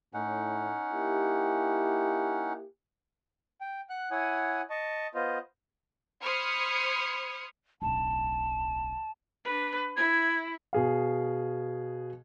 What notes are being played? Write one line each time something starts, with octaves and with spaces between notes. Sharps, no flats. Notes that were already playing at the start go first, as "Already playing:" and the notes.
A2 C#4 D#4 F#5
A#3 E4 G4
G5
F#5 F#6
E4 C#5 F#5 G#5 D#6
D#5 A5 C#6
B3 F4 C5 D#5
C5 B5 D#6 F6 G#6 C#7
D1 B1 A5
D4 B4
E4 G#6
B2 G#4 F5